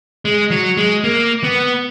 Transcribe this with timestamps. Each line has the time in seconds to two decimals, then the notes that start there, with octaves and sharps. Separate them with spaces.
0.25 G#3
0.51 F#3
0.77 G#3
1.04 A#3
1.44 B3